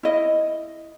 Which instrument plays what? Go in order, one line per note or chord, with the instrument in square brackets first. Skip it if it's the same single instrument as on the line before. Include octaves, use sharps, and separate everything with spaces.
[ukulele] E4 D#5